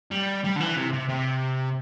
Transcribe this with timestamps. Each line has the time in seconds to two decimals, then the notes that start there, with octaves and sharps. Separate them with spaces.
0.11 G3
0.44 G3
0.56 D3
0.60 E3
0.76 C3
0.93 C3
1.10 C3